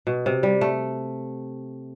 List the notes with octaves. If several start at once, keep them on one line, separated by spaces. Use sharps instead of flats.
B2
C3
G3
A3